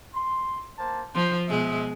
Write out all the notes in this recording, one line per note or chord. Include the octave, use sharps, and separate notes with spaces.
C6
A#3 C5 A5
F3 C5
B2 G#3 C5 D#5 E5